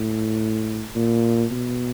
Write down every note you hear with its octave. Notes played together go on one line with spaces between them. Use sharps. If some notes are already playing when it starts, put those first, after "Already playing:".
Already playing: A2
A#2
B2